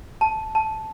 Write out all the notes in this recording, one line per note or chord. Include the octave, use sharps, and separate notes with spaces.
A5
A5